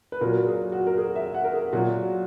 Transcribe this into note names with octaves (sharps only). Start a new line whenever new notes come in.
B4
A#2 F#3 A#4
G#4
F#4
A#4
G#4
E5
F#5
A#4
G#4
A#2 F#3 F#4